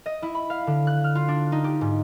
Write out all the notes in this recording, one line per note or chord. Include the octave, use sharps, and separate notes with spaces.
D#5
E4
B5
F5
D3
F#6
F6
F4
D4
D#4
G4
G#2